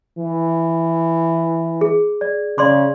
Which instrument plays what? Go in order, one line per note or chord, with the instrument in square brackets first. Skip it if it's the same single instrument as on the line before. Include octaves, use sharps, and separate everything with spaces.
[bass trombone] E3
[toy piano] G#4
D5
[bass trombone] C#3 [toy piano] D5 C6 D6